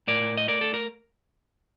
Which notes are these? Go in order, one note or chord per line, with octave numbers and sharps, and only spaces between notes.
A2 A#4 D5
D#5
A3 A#4 D5
A4
A#4